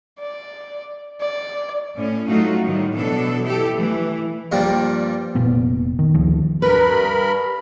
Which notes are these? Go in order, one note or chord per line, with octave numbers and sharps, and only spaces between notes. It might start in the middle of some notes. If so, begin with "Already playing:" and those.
D5
D5
A2 C#4
F#3 A3 D#4 F4 F#4
A2 D#3 G3
B2 E3 F#3 D4 A4
E4 G4 A4
E3 A3
G2 A#2 F3 G3
F1 A#2 A#3 B3
D#3
D2 D#3 F3
G2 A#4 B4 B5